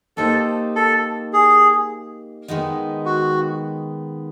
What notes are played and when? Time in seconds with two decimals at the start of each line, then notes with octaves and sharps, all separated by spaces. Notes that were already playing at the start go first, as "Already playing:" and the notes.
0.17 A#3 D#4 G4 A4 C5
0.76 A4
1.33 G#4
2.48 D#3 G#3 B3 D#4
3.05 F#4